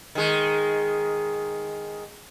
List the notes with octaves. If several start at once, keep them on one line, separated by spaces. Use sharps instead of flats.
D#3 G#3